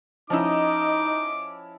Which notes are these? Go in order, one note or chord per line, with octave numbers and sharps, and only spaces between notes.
F3 C#4 D#4 E4 D#5 D6